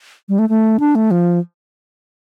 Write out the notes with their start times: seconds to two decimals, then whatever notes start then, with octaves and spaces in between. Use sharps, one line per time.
0.29 G3
0.39 A3
0.49 A3
0.80 D4
0.95 A3
1.11 F3